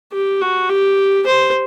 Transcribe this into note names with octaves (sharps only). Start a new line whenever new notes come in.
G4
F#4
G4
C5